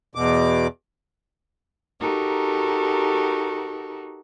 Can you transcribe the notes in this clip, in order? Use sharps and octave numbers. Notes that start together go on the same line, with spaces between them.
E2 B2 D6
D#4 F#4 G4 A4 A#4